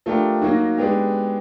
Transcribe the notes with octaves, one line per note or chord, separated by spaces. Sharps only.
F3 A3 D4 G4 A#4
F#3 A#3 D#4 F#4
G#3 B3 D4 G4